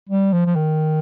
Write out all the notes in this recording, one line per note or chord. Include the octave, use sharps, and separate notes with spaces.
G3
F3
F3
D#3